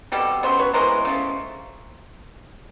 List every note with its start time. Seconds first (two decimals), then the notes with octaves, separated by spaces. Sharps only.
0.12 B2 G3 C4 G4 A4
0.43 C#3 F#3 B3 C5
0.59 B4 C#5
0.74 E3 G#3 B3 A#4 C5
1.05 C#3 F3 A3